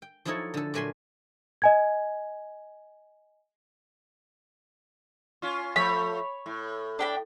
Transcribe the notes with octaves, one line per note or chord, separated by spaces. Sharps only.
G5
F3 F#3 D#4 E4 A4 C#5
D3 A4
A#2 F#3 A3 G#5 B5 C6
D#5 G#5 G#6
C#4 F4
F3 A3 C#5 B5
A2
D4 G5 B5